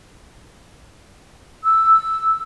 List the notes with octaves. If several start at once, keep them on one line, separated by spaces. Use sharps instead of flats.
E6